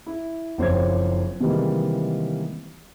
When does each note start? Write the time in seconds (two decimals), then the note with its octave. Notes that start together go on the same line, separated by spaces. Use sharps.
0.06 E4
0.58 F#1 F2 C5 C#5 D6 G#6
1.40 C3 D#3 E3 G3 G#3 A#3